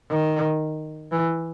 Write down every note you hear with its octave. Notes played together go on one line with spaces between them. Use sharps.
D#3
E3